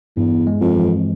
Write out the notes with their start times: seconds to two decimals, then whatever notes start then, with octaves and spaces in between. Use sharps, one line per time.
0.17 E2 G2
0.47 G#3
0.61 F2
0.75 E3